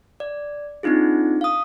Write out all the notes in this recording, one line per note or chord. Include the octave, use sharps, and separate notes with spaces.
D5
C4 D4 D#4 F4 G#4
F5 D#6